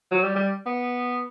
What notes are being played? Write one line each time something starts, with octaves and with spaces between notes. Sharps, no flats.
F#3
G3
G3
B3